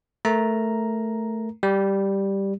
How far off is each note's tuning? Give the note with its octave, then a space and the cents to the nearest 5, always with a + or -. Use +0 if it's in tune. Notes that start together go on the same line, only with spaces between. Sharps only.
A3 +0 A#4 +5 A#5 +0
G3 +0 G4 +0